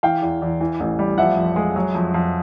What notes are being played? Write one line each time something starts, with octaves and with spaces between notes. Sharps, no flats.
E3 F5 G5
E2
E2
E3
A1
G3
F3 E5 F#5
F2
G#3
F#3
F2
F2